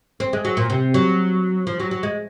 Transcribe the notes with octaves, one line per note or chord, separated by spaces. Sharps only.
C4
G#3
F#3
A#2
C3
F#3
F3
F#3
F#3
G#3